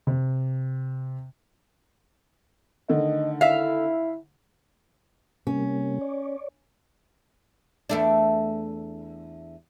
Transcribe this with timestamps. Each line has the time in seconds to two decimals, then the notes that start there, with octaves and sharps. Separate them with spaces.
0.07 C3
2.89 D3 D#3 A3 D#5
3.41 E4 E5 F5
5.47 C3 G3 A#3 C#4
6.01 C#5 D5
7.89 E2 A3 D4